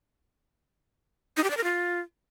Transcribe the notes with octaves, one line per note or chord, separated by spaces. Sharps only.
D#4
G4
D5
A#4
F4